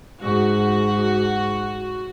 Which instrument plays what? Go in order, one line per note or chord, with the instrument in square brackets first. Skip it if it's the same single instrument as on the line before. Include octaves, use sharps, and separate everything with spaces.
[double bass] G#2 [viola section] F#4